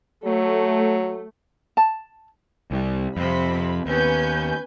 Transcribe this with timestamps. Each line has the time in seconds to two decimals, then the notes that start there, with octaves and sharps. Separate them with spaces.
0.25 F#3 A3
1.77 A5
2.71 C2 G3
3.17 F2 C3 C4 B5
3.86 D#2 B3 C#4 B4 G#5 G6